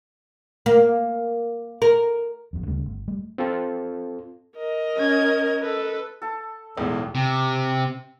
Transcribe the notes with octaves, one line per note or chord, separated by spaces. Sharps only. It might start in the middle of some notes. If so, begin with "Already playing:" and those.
A#3
A#4
G1 F2
D2 C#3 G3 A3
G1
G3 A3
C4 F4 A4
A#4 D#5
C#4 G#6
A4 B4
A4 A5
B1 E2 A2 G#3
C3